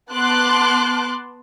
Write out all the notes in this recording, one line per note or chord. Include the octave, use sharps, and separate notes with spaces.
B3 A5 C6 D6 F#6